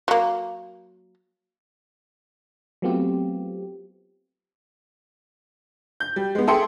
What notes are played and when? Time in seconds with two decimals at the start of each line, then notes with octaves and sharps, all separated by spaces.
0.08 F#3 A#3
2.82 F#3 A3 B3 C4 F4 G4
6.00 G6
6.16 G3
6.35 G#3 B3
6.47 G#4 A4 E5 G5 C6 C#7